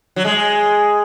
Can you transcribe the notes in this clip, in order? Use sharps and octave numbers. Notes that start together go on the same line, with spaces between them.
F#3
G#3